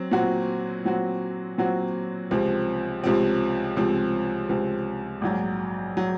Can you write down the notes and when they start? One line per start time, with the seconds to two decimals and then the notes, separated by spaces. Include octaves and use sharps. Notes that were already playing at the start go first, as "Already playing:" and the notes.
Already playing: F#3 C4
0.12 A#2 F#3 C4 F#4
0.85 A#2 F#3 C4 F#4
1.58 A#2 F#3 C4 F#4
2.31 C#2 C3 F3 C4
3.04 C#2 C3 F3 C4
3.76 C#2 C3 F3 C4
4.49 C#2 C3 F3 C4
5.21 A#1 G#2 F#3
5.97 F#3